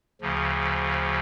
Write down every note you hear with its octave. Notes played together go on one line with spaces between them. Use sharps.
D2 C#3 F3